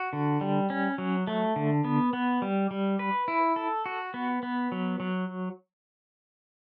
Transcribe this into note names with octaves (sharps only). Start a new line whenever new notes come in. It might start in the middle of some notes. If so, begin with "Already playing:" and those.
Already playing: F#4
D3
G3
C#4
F#3
A3
D3
B3
B3
G3
G3
B4
E4
A4
F#4
B3
B3
F#3
F#3